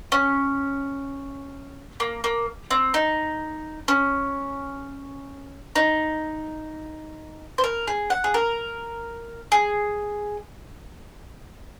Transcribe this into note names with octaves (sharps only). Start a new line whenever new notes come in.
C#4
A#3
A#3
C4
D#4
C#4
D#4
C5
A#4
G#4
F#5
G#4
A#4
G#4